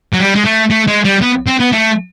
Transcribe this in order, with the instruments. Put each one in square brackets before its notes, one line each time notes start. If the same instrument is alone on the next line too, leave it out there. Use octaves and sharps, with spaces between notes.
[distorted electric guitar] F#3
G3
G#3
A3
A3
G#3
G3
B3
C4
B3
A3